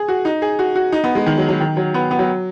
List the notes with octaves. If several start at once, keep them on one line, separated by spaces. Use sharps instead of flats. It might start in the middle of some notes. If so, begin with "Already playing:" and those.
Already playing: G#4
F#4
D#4
G#4
F#4
F#4
D#4
B3
G#3
D#3
F#3
F#3
D#3
F#3
B3
B3
F#3